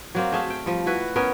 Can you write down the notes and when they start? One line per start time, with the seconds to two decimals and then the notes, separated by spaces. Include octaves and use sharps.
0.15 F#3 A#3 C4
0.32 A3 G#4 E5 F5
0.50 G5
0.66 F3 G3
0.86 E4 F#4 B4
1.16 B3 C#4 A#4